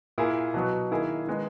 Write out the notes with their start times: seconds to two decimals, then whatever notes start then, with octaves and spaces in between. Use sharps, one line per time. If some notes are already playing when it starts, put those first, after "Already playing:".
0.18 A#2 A#3 E4 G#4
0.54 B2 F#3 B3
0.91 D#3 A#3 E4 G#4
1.27 D#3 G#3 B3 D#4